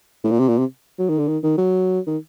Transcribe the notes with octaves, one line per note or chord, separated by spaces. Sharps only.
A2
A#2
C3
A#2
C3
F#3
D#3
D3
D#3
D#3
F#3
D#3